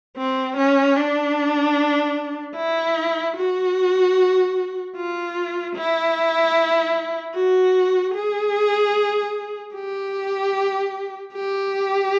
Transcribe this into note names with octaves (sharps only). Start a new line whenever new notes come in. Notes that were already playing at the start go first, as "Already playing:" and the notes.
C4
C#4
D4
E4
F#4
F4
E4
F#4
G#4
G4
G4